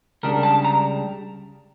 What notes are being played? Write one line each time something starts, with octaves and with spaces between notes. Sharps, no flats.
C#2 C#3 G3 D4 A#4
A5
A#5